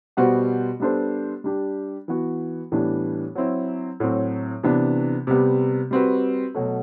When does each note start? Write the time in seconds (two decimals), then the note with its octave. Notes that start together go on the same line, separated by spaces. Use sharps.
0.17 B2 G3 B3 F#4 C5
0.80 G3 B3 D4 A4 C5
1.44 G3 D4 G4
2.08 E3 B3 F#4
2.72 A2 E3 G3 B3 D4
3.35 F#3 C4 E4
4.00 A2 F#3 C4
4.63 C3 E3 B3 D4
5.27 C3 G3 B3
5.91 G3 C4 F#4 B4
6.55 B2 F#3 A3